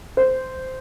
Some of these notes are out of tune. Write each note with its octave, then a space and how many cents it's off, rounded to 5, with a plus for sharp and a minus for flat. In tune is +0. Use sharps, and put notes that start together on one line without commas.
C5 -10